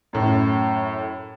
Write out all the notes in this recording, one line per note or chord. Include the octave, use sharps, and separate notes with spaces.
F#2 A2